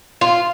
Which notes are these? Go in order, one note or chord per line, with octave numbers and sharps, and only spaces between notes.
F4